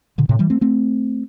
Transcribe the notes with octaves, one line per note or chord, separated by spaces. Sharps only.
A#2 D3
A2 C3
E3 G3
A3 C4
A3 C4